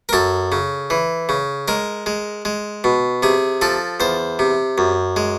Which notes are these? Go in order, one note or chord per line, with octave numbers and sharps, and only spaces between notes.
A#4
F#2 A4
C#3
E3
C#3
G#3 A#4
G#3
G#3
B2
C3 G#4
F3 A4
E2 C5
C3
F#2
G#3